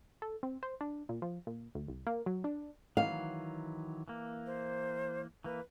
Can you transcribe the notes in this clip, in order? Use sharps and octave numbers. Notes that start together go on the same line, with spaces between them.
A4
C4
C5
D4
A#2
F3
A#2
D2
C2
A#3
F#3
D4
D#3 E3 F#3 F5
E3 A#3
C5
E3 A#3 B4